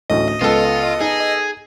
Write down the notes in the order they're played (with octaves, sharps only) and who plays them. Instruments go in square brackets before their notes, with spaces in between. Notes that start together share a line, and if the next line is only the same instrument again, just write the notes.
[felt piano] A1 D2 A2 [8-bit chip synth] D#5
[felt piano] C#2 [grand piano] B3 A4 [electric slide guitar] F4
[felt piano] D#4 [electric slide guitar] G#4